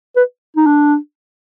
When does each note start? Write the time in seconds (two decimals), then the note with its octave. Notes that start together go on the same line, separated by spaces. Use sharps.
0.16 B4
0.57 D#4
0.66 D4